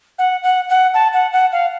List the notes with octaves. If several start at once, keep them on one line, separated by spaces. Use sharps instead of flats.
F#5
F#5
F#5
A5
F#5
F#5
F5